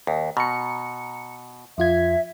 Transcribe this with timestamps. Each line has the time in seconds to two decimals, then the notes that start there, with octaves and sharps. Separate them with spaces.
0.07 D#2
0.37 B2 A#5 C#7
1.78 F2 F4 E5 G#6